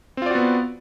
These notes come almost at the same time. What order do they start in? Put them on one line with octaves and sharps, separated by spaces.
C4 F4 D5 F#4 B3